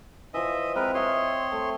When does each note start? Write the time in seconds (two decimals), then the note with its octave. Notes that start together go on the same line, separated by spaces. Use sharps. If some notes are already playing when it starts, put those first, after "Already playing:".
0.34 E3 F3 D#5 E5
0.76 G#3 C4 A#4 B4
0.94 C#5 D#5 E5 G5 C6
1.52 A3